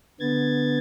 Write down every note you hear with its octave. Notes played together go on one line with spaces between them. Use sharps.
D3 B3 G#6 A6